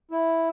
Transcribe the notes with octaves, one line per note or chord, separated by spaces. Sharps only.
E4